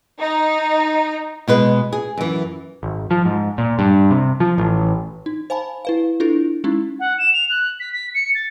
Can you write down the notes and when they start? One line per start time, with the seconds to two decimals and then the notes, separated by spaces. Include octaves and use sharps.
0.20 D#4
1.48 B2 G#3 B4
1.93 G#4
2.17 F#2 E3
2.83 G#1
3.11 F3
3.25 G#2
3.58 A#2
3.79 G2
4.11 C3
4.40 F3
4.58 A1
5.26 D#4
5.50 C5 F5 G#5 A5 B5
5.85 E4 B4 F5
6.20 D4 E4 F4 A4
6.64 G#3 C#4 D#4 E4
6.99 F#5
7.18 E7
7.33 F7
7.49 F#6
7.79 B6
7.92 B6
8.14 C#7
8.34 A6